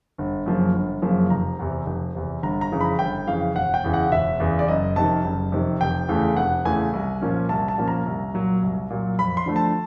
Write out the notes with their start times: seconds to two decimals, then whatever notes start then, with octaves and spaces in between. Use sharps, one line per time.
0.18 G1
0.46 F#2 C#3 F3 A#3
0.75 G1
1.02 F#2 C#3 F3 A#3
1.30 F1 A#5
1.59 E2 C3
1.86 F1
2.15 E2 C3
2.43 G1 A#5
2.61 A#5
2.72 F2 C#3 E3
2.81 B5
2.99 G1 G5
3.27 F2 C#3 E3 F5
3.56 E1 F#5
3.74 G5
3.84 E2 C#3 E3
3.94 F#5
4.12 E1 E5
4.40 E2 C#3 E3
4.59 D5
4.68 F#1 D#5
4.96 F2 C3 D#3 A5
5.24 F#1
5.52 F2 C3 D#3
5.81 F1 G5
6.08 E2 C#3 E3 A3
6.37 F1 F#5
6.65 E2 C#3 E3 A3 G#5
6.93 C2
7.21 A#2 F3 A#3 C#4
7.49 C2 A5
7.68 A5
7.78 A#2 F3 A#3 C#4
7.88 A#5
8.06 C2
8.34 A#2 F#3
8.62 C2
8.90 A#2 F#3
9.19 F2 B5
9.37 C6
9.46 D3 F3 A3
9.56 A5